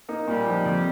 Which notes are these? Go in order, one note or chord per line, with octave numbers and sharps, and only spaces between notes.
A#3 D#4
A#2 G3
F3 D#4
F2